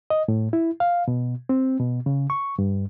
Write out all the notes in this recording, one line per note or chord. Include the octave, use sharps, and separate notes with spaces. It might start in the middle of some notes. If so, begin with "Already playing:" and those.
D#5
A2
E4
F5
B2
C4
B2
C#3
C#6
G2